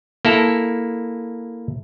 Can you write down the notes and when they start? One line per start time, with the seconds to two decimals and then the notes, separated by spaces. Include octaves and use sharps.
0.25 A#3 E4 A4